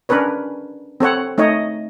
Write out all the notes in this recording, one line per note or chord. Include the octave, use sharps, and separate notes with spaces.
C#4 D4 A#4 B4 C#5
C4 A4 C#5 F#5
A3 D#4 C#5 D#5